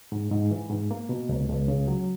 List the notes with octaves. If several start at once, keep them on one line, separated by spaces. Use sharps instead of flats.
G#2
G#2
E3
G#2
A#3
B2
C#2
C#2
C#3
F#3